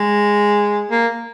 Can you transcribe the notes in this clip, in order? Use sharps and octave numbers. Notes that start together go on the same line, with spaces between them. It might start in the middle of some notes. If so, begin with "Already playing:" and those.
Already playing: G#3
A#3